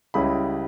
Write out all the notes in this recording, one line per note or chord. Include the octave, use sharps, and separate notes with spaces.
C#2 C#3 G3 C#4 E4 B5